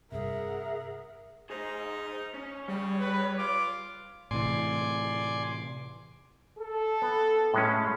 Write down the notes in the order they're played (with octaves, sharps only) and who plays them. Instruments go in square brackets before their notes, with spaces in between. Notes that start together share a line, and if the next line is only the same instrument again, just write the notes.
[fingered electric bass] G2 C3 [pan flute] G#4 [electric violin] A#4 F#5 [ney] E5
[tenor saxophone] D#4 [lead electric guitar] G#4 C5
[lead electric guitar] C#4
[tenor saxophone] C#3 [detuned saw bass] G3 [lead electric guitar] C#5
[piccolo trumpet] B4
[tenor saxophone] F4 [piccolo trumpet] D6
[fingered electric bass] A2 C3 E3 [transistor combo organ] D5 G#5 C6
[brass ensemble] A4
[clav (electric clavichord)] B3
A2 G#3 C#4